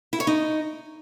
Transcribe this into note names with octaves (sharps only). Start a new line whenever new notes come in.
E4
C#5
D#4